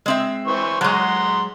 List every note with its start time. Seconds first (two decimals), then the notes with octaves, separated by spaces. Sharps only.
0.06 G#3 C4 E5
0.47 E3 C5 C#6
0.81 F#3 G#3 F#5 A#5 C6